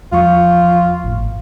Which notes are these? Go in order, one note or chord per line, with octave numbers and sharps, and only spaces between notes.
E2 F3 F4 C#6
G#1 A2